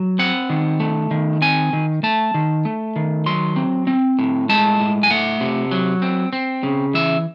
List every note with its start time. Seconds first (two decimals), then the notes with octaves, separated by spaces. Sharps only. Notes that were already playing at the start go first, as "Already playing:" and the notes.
Already playing: F#3
0.19 C4 F#5
0.49 D#3
0.80 A3
1.11 D#3
1.42 C4 G#5
1.73 D#3
2.03 A3 A5
2.34 D#3
2.65 A3
2.96 D#3
3.26 F#3 C6
3.56 C4
3.87 C4
4.19 A2
4.49 G#3 A5
4.80 A2
5.03 G#5
5.10 A3 F#5
5.40 C3
5.72 F#3
6.02 C4
6.33 C4
6.63 C#3
6.94 E3 E5